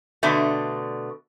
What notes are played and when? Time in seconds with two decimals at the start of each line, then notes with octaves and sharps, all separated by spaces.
0.23 B2 D3 A3